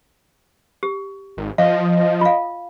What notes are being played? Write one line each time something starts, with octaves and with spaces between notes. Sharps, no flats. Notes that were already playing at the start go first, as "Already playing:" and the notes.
G4
G#1
F3 D#5 F5
F4 F5